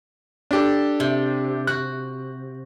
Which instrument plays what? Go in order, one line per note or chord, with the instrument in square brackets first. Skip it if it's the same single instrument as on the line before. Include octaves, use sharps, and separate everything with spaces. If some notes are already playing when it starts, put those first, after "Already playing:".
[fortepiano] D4 G4 A4
[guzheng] C3
[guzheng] F#4 [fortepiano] F#6